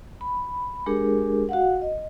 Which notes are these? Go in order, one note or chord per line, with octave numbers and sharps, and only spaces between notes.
B5
G#3 D4 G4 G#4 A#4
F#4 F5 F#5
D#5